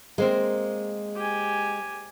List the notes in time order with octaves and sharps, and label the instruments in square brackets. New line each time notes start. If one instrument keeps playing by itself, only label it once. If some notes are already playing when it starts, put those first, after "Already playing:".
[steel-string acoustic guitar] G#3 [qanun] A#3 C4 A#4
[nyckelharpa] G4 G#5